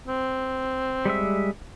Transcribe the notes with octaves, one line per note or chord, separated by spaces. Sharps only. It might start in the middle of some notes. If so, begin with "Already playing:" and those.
C4
G3 G#3 E5